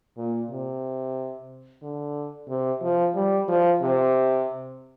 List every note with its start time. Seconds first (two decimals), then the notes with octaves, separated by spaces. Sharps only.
0.17 A#2
0.50 C3
1.83 D3
2.49 C3
2.82 F3
3.15 G3
3.48 F3
3.82 C3